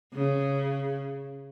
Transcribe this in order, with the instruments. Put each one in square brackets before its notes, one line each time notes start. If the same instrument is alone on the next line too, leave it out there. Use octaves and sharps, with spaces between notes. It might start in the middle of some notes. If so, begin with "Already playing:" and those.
[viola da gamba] C#3